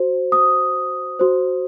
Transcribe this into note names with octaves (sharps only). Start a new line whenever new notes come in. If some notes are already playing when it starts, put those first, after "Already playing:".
Already playing: F#4 C5
D#6
F#4 C5